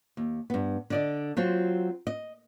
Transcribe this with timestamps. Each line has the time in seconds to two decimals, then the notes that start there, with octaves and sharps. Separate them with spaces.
0.17 D#2
0.50 G2 B3
0.90 D3 D5 D#5
1.37 F#3 C4 F4
2.07 D#5